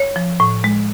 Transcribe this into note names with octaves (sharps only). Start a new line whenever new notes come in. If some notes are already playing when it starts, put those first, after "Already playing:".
Already playing: C#5
F3
A2
G#3